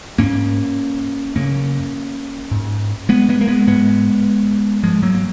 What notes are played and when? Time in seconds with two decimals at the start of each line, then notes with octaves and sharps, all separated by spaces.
0.18 G#2 A#3 C#4
1.35 F#2 C#3 A#3 C#4
2.51 G#2
3.09 G#3 B3
3.29 G#3 B3
3.41 A#3
3.48 G#3 B3
3.67 G#2 G#3 B3
4.83 G#2 F3 G#3
5.03 F#3 A#3
5.15 A#3